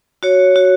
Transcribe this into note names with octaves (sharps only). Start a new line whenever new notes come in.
F#4 C#5
F#4